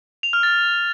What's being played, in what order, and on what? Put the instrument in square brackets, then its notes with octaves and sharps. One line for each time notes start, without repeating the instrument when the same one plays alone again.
[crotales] F7
F6
A6